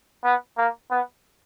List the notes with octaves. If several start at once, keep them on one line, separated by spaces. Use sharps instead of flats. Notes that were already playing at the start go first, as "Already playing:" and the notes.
B3
A#3
B3